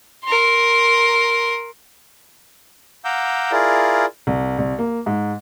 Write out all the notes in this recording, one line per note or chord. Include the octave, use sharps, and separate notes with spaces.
A#4 C6
F5 F#5 A#5 D6 E6 G6
E4 F4 G#4 A#4 D5
C2
C2
A#3
G#2